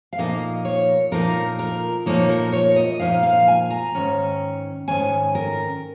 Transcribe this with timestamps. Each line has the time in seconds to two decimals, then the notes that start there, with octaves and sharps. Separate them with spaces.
0.13 F5
0.18 A#2 F3 A#3 D#4 D#5
0.65 C#5
1.12 A#2 F3 A#3 D#4 A#4
1.59 A#4
2.06 A#2 F3 A#3 D#4 C#5
2.29 A#4
2.53 C#5
2.76 D#5
3.00 A#2 F3 A#3 D#4 F5
3.23 F5
3.48 G#5
3.70 A#5
3.95 G#2 D#3 C#4
4.88 G#2 D#3 C#4 G#5
5.35 A#4